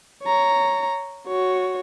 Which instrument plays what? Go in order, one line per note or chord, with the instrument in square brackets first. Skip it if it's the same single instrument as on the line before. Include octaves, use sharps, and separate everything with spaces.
[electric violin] C#5 A#5
F#4 C#5